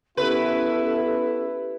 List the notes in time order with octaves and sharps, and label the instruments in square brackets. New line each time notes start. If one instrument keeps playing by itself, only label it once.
[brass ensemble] B3 E4 [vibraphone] C#4 G4 [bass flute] A4 [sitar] B4